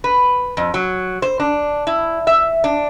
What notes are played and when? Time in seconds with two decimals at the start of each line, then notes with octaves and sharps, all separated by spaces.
0.04 B4
0.57 F2
0.74 F#3
1.22 C5
1.40 D4
1.87 E4
2.27 E5
2.64 D4